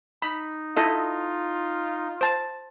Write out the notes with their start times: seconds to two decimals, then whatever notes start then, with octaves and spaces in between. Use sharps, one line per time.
0.22 D#4 B5
0.77 E4 F4 A4 D#5
2.21 C5 A5